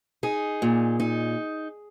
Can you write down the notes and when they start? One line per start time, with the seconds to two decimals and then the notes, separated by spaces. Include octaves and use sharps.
0.23 D#4 G#4
0.62 A#2
1.00 D#4